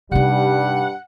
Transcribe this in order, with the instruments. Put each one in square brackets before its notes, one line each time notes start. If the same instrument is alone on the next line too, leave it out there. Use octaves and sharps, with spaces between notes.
[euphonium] G2 [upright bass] C3 D#4 [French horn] G3 [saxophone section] F#5